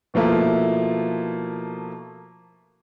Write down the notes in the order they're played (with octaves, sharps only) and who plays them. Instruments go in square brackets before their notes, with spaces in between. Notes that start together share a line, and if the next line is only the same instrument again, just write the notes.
[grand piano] B2 F3 A3 A#3 E4